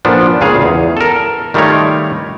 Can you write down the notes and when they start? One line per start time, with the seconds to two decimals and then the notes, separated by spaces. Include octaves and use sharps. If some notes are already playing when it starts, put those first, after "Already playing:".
0.05 A#2 F3 B3 D4 A4
0.41 C#2 A#2 C#3 G#4 F5
0.62 E2
0.97 A4 A#4
1.54 D#3 G3 A3 F4 A#4 C#5